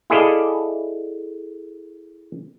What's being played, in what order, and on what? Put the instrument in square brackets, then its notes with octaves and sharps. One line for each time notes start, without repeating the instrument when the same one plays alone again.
[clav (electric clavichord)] E4 G#4 A4 D5 D#5 F5